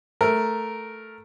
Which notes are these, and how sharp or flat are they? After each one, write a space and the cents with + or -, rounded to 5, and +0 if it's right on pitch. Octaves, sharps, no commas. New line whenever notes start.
A3 +0 A#4 +0